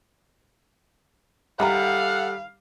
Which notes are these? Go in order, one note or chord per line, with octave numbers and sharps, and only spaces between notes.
D#3 G3 E4 G4 A4 F5 F#5 A#5